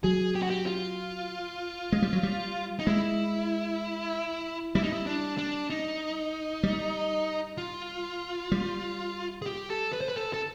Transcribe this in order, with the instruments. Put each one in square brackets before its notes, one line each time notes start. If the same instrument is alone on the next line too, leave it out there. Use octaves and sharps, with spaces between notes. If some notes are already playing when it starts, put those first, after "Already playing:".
[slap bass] F#3 [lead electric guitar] G#4
[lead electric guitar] G4
F#4
G4
F4
[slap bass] G#3
G3
F#3
G3
[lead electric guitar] D#4
[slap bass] G#3 [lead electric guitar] E4
[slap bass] G3 [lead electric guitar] E4
[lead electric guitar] D#4
E4
D4
D4
D#4
[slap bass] G3
[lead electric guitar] F4
[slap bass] G3
[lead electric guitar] G#4
G4
A4
B4
C5
B4
A4
A4